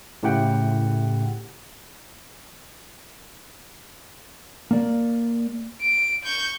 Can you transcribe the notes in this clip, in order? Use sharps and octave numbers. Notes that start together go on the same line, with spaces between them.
A2 C#3 E4 G4 F#5 G5
A#3 D5
D7
C#6 G6